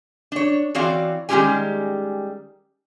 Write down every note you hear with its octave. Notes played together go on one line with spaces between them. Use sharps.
D4 C#5
E3 C4 F#4 C#5 D5 F5
D#3 G3 G#3 C#4 G4 G#5